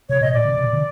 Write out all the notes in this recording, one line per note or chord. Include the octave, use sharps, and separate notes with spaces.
C3 C#5
B2 D#5
A#2 D5
C#3
C3
B2
D3